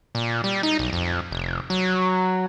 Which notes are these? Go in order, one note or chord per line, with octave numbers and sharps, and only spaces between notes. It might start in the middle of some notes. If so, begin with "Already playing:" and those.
A#2
G3
D#4
B1
F2
F1
F#3